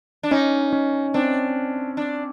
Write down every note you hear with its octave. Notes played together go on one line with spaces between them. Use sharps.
D4
C#4 D#4
C#4
C4 D4
D4